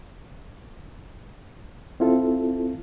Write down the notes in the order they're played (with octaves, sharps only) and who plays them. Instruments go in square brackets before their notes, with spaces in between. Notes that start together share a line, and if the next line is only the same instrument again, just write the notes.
[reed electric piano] C4 E4 F4 A4